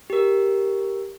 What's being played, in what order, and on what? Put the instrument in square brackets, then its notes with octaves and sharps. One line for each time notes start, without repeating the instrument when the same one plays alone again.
[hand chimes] G4 A#4